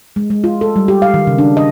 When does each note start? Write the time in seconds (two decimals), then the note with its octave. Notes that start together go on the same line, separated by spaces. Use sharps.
0.16 G#3
0.30 G#3
0.44 F4
0.61 A4
0.76 G3
0.88 G4
1.02 F5
1.14 D#3
1.27 C#3
1.38 D4
1.57 D#5